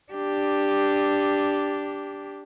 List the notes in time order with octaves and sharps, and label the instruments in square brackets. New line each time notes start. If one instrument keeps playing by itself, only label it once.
[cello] D4 G4